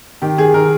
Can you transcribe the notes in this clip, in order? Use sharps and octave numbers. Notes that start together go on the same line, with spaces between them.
D#3 G4
D#3 G#4
D#3 A#4